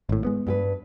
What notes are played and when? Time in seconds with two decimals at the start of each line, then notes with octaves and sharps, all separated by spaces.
0.09 G#1 A2
0.25 G#3 B3
0.47 G2 G4 B4